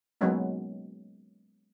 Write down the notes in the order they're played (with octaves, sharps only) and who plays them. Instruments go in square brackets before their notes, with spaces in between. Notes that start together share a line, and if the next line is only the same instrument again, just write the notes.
[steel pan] F#3 G#3 A#3 B3 C#4 D#4